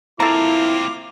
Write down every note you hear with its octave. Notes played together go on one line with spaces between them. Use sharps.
A#3 C4 E4 F4 A4 F5 A#5 D6